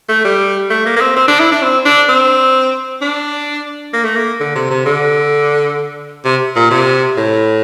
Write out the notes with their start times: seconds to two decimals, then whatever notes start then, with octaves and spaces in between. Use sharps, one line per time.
0.09 A3
0.25 G3
0.70 A3
0.86 A#3
0.96 A#3
1.01 C4
1.16 C4
1.28 D4
1.39 E4
1.52 D4
1.62 C4
1.86 D4
2.09 C4
3.01 D4
3.93 A#3
4.04 A3
4.15 A#3
4.40 D3
4.56 C3
4.70 C3
4.86 D3
6.25 C3
6.56 A#2
6.71 C3
7.17 A2